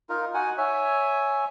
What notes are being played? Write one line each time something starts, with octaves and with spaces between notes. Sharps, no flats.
D#4 F4 A#4
D#4 F#4 F#5 G#5
C#5 E5 G#5